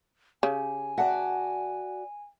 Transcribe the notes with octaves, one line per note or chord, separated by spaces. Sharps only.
C#3 G4 C#5 G#5
F#4 D5 E5 F#5 A5